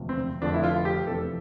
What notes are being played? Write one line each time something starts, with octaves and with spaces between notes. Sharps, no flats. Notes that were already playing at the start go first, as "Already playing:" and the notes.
Already playing: E1 D2 C3 F3
C4
F1 F2 D3 F3 D4
E4
F4
G4
F1 E2 C3 F3 A4